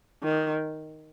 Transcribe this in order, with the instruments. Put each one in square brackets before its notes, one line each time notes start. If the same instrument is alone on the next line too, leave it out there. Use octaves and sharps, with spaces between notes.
[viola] D#3